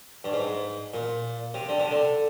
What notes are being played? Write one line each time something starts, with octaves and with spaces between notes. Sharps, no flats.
G2
G#2
A#2
C3
D3
C3
D3